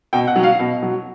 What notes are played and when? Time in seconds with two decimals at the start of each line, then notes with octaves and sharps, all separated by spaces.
0.13 B2 G5
0.27 F#5
0.36 F#3
0.43 F5
0.59 B2
0.83 F#3